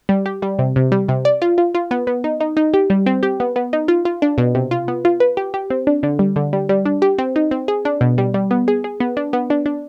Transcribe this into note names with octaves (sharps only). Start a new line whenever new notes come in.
G3
G4
G3
C3
C3
G3
C3
D5
F4
F4
F4
B3
B3
D#4
D#4
D#4
G4
G3
C4
G4
B3
B3
D#4
F4
F4
D4
B2
C3
F4
B3
F4
B4
G4
G4
C4
D4
D3
G3
D3
G3
G3
D4
G4
C4
D#4
C4
G#4
D4
B2
G3
G3
B3
G#4
G#4
B3
D4
B3
D4
D4